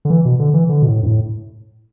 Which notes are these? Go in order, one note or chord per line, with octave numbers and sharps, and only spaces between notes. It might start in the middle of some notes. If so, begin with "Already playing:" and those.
D3
E3
B2
D3
E3
D3
B2
A2
G2
A2